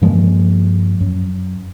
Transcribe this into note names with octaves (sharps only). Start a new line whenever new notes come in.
G2 F3 G#3 A#3
F#2